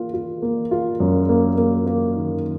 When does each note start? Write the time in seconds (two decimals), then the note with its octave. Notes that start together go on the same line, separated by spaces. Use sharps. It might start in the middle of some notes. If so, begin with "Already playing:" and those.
Already playing: A#3 F4
0.13 F4
0.42 A#3
0.71 F4
1.00 F#2
1.29 A#3
1.58 A#3
1.87 A#3
2.16 D#3